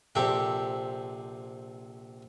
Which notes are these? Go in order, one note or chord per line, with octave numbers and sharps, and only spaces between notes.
A#1 C3 G4 A4 E5 D6